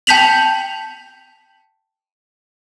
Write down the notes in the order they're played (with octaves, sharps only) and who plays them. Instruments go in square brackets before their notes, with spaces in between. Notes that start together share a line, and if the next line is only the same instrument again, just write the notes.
[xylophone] G5 A5 G6 B6 F7 F#7